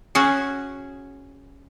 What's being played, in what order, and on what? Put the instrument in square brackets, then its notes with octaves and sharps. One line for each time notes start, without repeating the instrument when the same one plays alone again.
[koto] C#4 F#4 G#4